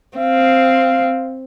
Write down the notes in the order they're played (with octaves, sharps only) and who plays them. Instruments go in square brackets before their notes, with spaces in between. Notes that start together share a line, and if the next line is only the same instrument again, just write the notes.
[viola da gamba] C4 [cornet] F5